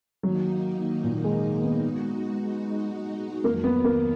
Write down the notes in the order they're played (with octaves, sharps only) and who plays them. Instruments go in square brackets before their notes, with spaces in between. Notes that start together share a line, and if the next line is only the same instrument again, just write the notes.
[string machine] D#3 A#3 D#4 [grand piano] F#3
[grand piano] A#2
G#3
B3
[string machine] G#3 D#4 F#4
[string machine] F2 D#3 F#3 [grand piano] A#3
[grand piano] B3
A#3